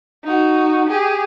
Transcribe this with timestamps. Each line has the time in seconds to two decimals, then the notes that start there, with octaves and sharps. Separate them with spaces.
0.24 D#4 F#4
0.89 G4 G#4